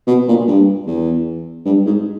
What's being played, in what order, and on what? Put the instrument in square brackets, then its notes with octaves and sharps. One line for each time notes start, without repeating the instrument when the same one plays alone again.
[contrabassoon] B2
A#2
G2
E2
G2
G#2